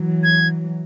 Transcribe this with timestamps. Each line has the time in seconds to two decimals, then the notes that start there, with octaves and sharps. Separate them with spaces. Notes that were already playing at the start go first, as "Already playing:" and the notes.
Already playing: E3 F#3
0.23 G#6